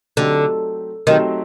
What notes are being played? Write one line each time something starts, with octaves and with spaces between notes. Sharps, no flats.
D3 F#3 A3 C4 D#4 G4
D#3 F#3 A3 C4 D#4 G4